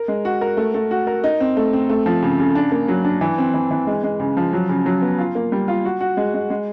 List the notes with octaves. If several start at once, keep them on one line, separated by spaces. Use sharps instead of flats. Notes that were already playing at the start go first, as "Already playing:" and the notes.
Already playing: A#4
G#3
F#4
A#4
A3
A3
F#4
A#4
D#4
C4
A3
C4
A3
F3
C#3
C#3
D4
A#3
F#3
D4
E3
C4
E3
E3
G#3
G#3
C#3
F3
F#3
C#3
F#3
B3
F4
A#3
G3
F4
F#4
F#4
G#3
G#3
G#3